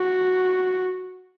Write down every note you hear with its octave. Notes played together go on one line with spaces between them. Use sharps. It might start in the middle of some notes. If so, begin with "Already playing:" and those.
Already playing: F#4